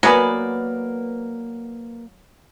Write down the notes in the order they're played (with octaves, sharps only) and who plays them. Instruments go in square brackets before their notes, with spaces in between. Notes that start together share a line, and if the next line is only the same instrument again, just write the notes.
[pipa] F#3 B3 D5 [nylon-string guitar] A#3 B4 G#5